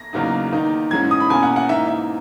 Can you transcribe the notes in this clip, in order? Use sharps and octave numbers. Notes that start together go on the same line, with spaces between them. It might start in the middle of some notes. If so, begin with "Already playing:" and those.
Already playing: A#6
E2 C#3 F#3 A#3 D#4
E2 D#3 A#3 D#4
G#2 E3 G#3 C#4 G#6
D#6
B5
E2 B2 A#3 C#4 G#5
F#5
F#5
G#2 E3 A#3 D#4 E5
E5